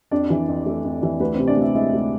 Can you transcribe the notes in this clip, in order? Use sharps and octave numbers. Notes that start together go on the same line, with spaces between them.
F2 D4 D5
E3
F2
A3
F2
E3
D2 B4
C3 C4 C5
D4 D5
D2 E4 E5
G#3 E4 E5
D2